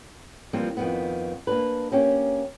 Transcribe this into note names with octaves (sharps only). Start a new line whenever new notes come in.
E3 F3 G3 A#3 C4 F4
F2 D#3 B3
A#3 D4 B4
A#3 C#4 G4